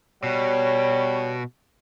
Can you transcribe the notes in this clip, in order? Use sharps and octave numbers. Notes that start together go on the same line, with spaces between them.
B2 G3 C#5